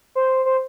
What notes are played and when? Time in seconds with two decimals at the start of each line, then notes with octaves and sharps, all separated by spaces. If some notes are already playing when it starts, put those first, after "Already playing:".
0.15 C5
0.45 C5